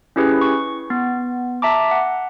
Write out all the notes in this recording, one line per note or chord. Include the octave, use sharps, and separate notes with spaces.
C#4 E4 G4 G#4 B4
C#6
B3
E5 A5 A#5 D6
F#5